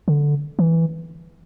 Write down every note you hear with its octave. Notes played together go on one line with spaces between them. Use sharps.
D3
E3